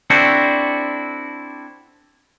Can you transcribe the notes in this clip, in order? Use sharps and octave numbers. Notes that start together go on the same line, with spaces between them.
C4 D4 E4 F#4 A4 C5